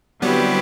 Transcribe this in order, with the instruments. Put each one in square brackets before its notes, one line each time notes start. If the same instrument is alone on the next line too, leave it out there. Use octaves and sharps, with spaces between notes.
[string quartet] D3 F#3 C4 E4 G4 [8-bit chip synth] G3 B3